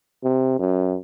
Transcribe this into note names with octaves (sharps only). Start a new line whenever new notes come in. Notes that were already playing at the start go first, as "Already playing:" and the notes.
C3
F#2